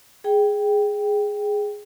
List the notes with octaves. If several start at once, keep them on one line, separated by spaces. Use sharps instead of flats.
G#4 G5